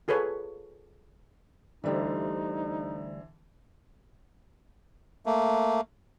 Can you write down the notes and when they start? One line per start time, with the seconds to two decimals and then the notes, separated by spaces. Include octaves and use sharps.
0.08 F4 G#4 A4 B4 C#5
1.84 D2 D3 E3 G3 D#4 C5
5.26 A3 A#3